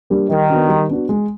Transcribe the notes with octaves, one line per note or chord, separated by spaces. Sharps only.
G3 A#3 D4 G4
D#3 G3
B3 D4 F#4
G3
B3 D4 F#4
G#3